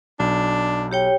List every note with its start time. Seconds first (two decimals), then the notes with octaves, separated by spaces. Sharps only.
0.20 B1 D4
0.91 G4 C#5 G5